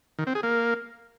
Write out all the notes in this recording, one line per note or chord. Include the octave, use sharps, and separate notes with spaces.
D#3
C4
G#4
A#3